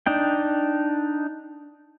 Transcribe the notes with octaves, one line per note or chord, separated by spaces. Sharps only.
D4 D#4 G5